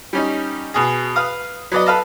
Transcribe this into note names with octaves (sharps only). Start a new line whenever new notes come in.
G3 C#4 D#4
B2 G#4
B4 F5 D#6
F#3 B3 D5 D#5
A4 B4 F5 A5